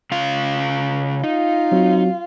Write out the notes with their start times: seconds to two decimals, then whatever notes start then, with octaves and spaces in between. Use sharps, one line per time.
0.12 C#3 F4 F5
1.24 D#4 F4
1.72 F#3 C4 F#4